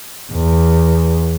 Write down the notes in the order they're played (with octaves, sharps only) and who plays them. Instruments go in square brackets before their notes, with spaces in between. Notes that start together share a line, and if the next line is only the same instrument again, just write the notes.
[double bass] E2